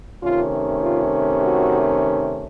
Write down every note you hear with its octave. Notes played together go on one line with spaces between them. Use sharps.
C3 D#3 A3 C#4 F4
F4
F#4